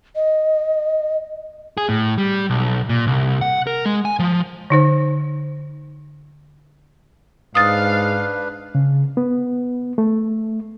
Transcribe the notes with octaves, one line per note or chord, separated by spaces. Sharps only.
D#5
G#4
A2
G3
B1
A#2
C2
F#5
A#4
G#3
G#5
F3
D3 D#4 C5
G#2 D4 B4 F5 D#6 A6
C#3
B3
A3